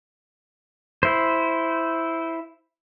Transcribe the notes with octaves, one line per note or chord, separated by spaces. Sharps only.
E4 C5